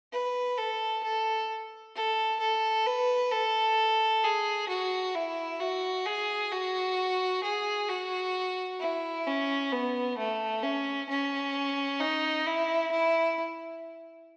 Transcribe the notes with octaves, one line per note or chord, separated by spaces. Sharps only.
B4
A4
A4
A4
A4
B4
A4
G#4
F#4
E4
F#4
G#4
F#4
G#4
F#4
E4
C#4
B3
A3
C#4
C#4
D#4
E4
E4